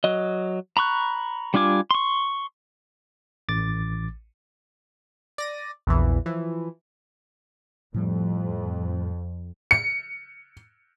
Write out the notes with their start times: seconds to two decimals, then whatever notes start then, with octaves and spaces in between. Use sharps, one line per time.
0.04 F#3 D#5
0.77 A#5 B5 C#6 F#6
1.54 G3 D4 F4 G#5 D6
1.91 C6 C#6
3.49 A1 D6 A6
5.38 D5 A#6 D#7
5.87 A#1 E2 E3
6.26 E3 F3
7.94 F2 A2 F3 G3
9.71 C#7